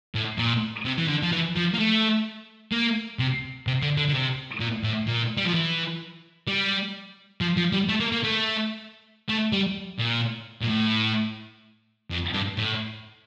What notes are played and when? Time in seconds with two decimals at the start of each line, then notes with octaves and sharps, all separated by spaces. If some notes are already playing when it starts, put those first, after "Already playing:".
0.15 A2
0.38 A#2
0.85 C3
0.98 E3
1.08 D3
1.23 F3
1.32 E3
1.56 F3
1.74 A#3
1.79 A3
2.72 A#3
3.19 C3
3.67 C3
3.83 D3
3.98 D3
4.09 D3
4.13 C3
4.60 A#2
4.83 A2
5.07 A#2
5.37 G3
5.45 F3
5.54 E3
6.48 G3
7.41 F3
7.57 F3
7.73 G3
7.89 A3
8.00 A#3
8.12 A#3
8.24 A3
9.29 A3
9.52 G3
9.99 A#2
10.63 A#2
10.70 A2
12.10 F2
12.33 G2
12.57 A2